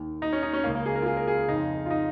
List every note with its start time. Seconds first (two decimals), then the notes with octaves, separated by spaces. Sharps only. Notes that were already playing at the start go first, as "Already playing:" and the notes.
Already playing: D#2 D#3
0.22 D#4
0.33 C#4
0.43 D#4
0.53 C#4
0.64 C#2 C#3 A#3
0.75 A#3
0.86 G#4
0.95 A#4
1.02 F4
1.06 G#4
1.17 A#4
1.27 G#4
1.48 F2 C#3 D#4
1.86 F4
1.90 D#4